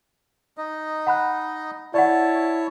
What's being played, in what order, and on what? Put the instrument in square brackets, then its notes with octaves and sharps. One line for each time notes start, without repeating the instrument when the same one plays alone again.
[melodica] D#4 D#5
[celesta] F#5 B5 F#6
[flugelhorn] E4 [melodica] C#5 A5 [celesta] D5 F#5